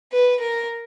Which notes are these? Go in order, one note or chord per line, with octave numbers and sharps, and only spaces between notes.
B4
A#4